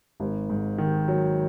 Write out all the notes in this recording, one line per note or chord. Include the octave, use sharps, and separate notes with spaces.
G#1
G#2
D#3
F#3